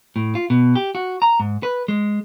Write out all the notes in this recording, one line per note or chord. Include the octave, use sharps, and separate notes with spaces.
A2
F4
B2
G4
F#4
A#5
G#2
B4
G#3